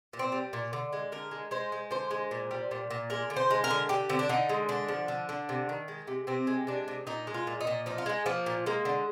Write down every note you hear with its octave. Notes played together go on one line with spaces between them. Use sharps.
A#2
C4
G3
A#2
D3
G#3
D3 A#4
G#3
G#3 C5
G#3
D3 C5
G#3
A#2
G3
A#2
A#2
G#3 A#4
D3
C5
G#3
A#4
D3
D3 G4
D3 C4
D4
D3 D#4
G#3
D3 D4
F3
D3
D3
C3
D#3
G#3
C3
C3 C4
G#3
C3 D4
C3
A#2 D#4
G#3
F4
A#2
D#4
A#2
F3 D#4
F4
G#3 D#4
F3 A#3
A#2
G#3 A#3
D3